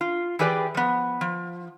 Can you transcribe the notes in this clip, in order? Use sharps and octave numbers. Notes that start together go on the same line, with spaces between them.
F4
E3 G4 G#4 B4 D5 G5
F3 B3
F3